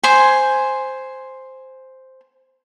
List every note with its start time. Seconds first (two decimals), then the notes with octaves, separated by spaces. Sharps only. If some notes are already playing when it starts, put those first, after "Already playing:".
0.03 C5 G#5